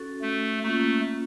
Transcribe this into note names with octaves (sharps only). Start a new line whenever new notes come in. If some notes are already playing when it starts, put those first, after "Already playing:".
Already playing: C#4 F#4 A4
A3
A3 A#3 C#4 F4